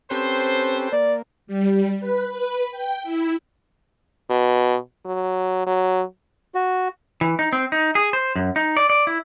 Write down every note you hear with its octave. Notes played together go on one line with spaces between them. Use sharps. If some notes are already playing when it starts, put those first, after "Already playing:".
C4 C#4 G4 A4 B4 C5
A#3 D5
G3
B4
B4
G5
E4
B2
F#3
F#3
F#4
E3
D#4
C4
D#4
G#4
C5
F#2
D#4
D5
D5
E4